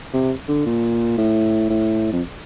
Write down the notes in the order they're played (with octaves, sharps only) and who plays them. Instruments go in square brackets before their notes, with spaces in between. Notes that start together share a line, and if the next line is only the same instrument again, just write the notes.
[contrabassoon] C3
D3
A#2
A2
A2
F2